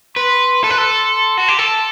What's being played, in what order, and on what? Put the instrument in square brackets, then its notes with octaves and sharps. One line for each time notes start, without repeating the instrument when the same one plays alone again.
[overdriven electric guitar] B4 [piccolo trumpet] C6
[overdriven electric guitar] A4 [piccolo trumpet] C6
[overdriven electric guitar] B4
A4
F#4
G4
[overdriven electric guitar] A4 [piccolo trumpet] A5